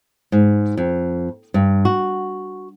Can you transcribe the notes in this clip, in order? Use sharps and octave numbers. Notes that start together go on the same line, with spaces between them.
G#2
F2
G2
F#4